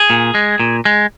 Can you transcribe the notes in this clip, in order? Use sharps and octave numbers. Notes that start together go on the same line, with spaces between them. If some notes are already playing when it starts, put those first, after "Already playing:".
Already playing: G#4
A#2
G#3
A#2
G#3